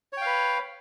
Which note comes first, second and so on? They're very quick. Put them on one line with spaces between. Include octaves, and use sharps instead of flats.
C#5 G5 F5 B4